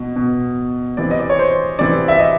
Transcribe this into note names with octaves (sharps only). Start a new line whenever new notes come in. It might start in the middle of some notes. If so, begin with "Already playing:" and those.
Already playing: B2
B2
C3 E3 D5
D#5
D5
C#5
C5
C3 E3 D5
E5
D#5